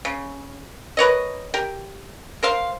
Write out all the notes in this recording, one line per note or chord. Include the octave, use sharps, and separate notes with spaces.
C#3
A#4 B4 C#5 D#5
G4 A#4
A#4 C5 F5